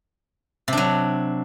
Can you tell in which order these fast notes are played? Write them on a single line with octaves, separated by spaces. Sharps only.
C3 D4 F#3